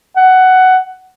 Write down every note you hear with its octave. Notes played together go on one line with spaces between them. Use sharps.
F#5